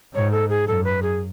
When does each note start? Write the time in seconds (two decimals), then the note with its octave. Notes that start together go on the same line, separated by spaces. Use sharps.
0.14 G#2 C#5
0.32 A4
0.49 G#4
0.67 F#2 A4
0.84 B4
1.02 G#4